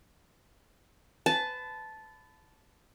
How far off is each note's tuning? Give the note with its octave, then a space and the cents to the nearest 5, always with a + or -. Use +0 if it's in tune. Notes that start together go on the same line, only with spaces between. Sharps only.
B4 +30 A5 -10